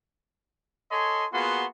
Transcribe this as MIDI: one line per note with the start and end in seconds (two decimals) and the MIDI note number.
0.91 1.26 69
0.91 1.26 73
0.91 1.26 75
0.91 1.26 80
0.91 1.26 84
1.32 1.65 58
1.32 1.65 59
1.32 1.65 65
1.32 1.65 66
1.32 1.65 68
1.32 1.65 84